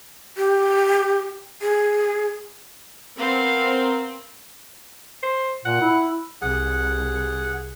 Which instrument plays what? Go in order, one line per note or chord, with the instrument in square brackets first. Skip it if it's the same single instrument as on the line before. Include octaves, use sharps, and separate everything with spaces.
[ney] G4
G#4
[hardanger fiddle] B3 F5 [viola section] C4 [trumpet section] A#4
[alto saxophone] C5
[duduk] A#2 [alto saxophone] F#5
[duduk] E4
[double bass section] C2 [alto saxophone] G#4 [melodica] F#5